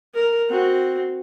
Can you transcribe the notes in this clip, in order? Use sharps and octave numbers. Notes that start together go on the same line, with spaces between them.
A#4
C4 F#4